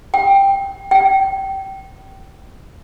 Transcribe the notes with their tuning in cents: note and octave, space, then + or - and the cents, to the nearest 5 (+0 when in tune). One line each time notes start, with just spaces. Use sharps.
G5 +10
G5 -20